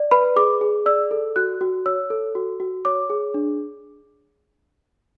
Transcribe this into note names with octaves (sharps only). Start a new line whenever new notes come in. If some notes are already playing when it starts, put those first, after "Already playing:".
Already playing: D5
B4 B5
G#4 D6
G#4
D5 E6
A4
F#4 F#6
F#4
C#5 E6
A4
F#4
F#4
C#5 D6
G#4
D4